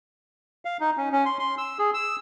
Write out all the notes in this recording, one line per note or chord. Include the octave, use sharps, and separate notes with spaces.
F5
D#4
C#4
C#4
C6
C6
E6
G#4
E6